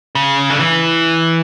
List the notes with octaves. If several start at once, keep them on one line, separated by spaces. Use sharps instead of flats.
C#3
D3
E3